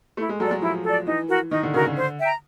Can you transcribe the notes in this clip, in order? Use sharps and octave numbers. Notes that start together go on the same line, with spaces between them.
A3 E4
G#3
F#3 A4 D5
F#3
F3 E4
A4 D5
E3 D#4
F#4 A#4
D#3 D#4
D3
C#3 F#4 A#4
D3
C5
E5 G5 A#5